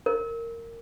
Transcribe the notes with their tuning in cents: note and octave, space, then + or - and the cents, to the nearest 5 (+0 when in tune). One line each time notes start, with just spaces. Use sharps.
A#4 -15